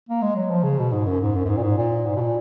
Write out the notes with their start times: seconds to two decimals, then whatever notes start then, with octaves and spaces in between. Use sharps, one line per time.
0.09 A#3
0.22 G#3
0.36 F#3
0.50 F3
0.64 C#3
0.79 B2
0.93 G#2
1.07 F#2
1.21 G#2
1.35 F#2
1.45 F#2
1.49 G#2
1.57 A#2
1.63 G#2
1.78 A#2
2.06 G#2
2.16 B2
2.21 A#2